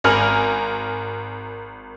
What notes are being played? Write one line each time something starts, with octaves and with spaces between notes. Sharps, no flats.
G#1 A#4 G#5 F6 F#7